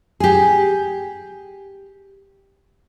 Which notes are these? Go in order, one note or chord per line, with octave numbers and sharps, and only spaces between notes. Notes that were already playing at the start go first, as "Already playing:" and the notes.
G4 G#4